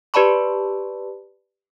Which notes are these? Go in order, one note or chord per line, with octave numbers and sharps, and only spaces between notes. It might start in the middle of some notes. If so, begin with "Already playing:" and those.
G4 B4 D5 A5 B5 C#6